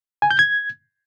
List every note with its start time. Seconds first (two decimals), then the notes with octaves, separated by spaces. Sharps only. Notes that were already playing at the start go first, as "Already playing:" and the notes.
0.22 G#5
0.31 G6
0.39 G#6